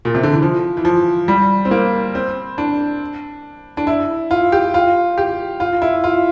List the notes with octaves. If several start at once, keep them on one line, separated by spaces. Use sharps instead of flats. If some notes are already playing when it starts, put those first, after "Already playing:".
A#2
C3
D3
E3
F3
E3
F3
G3
C4
A#3
C4
D4
D4
E4
F4
G4
F4
G4
F4
E4
F4